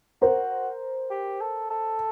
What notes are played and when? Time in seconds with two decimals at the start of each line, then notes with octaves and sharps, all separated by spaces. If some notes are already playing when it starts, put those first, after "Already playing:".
0.22 F#4 A#4 C5
1.10 G4
1.41 A4
1.70 A4